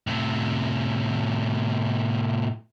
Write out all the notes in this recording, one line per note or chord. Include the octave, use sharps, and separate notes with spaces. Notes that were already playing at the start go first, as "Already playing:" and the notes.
A2 C3